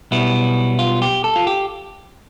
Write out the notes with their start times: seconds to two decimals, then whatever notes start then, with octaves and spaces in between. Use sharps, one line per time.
0.11 B1 B2 G3 B3 E4
0.79 F4
1.02 G4
1.24 A4
1.36 F4
1.47 G4